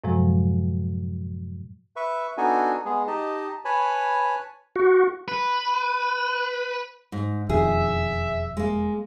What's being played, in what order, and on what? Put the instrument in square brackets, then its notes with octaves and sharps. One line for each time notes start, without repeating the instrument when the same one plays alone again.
[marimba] F#2 A2 C3 F3 F#3 G#3
[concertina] B4 E5 C#6
B3 D4 D#4 F#4 A4 G#5
G#3 B3 G#4
D#4 G4 D#5 A5
B4 C#5 G#5 A5 B5
[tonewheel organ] F#4
[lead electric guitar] B4
[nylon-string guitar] G#2
[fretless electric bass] E1 F2 D#3 [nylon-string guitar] G#4 [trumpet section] E5
[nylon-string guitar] G#3 A#3